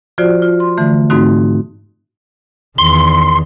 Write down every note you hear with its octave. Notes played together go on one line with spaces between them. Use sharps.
F3 F4 F#4 C5 D5
F4
C6
D3 E3 A3
G#2 A3 C4 D#4 F#4
E2 D#3 C6